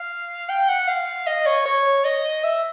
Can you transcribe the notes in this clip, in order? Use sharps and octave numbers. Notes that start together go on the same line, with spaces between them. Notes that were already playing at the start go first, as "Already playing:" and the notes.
Already playing: F5
G5
F#5
F5
D#5
C#5
C#5
D#5
E5